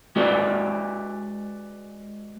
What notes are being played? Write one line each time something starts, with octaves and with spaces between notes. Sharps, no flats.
G#3 F#4 G4 B4 D5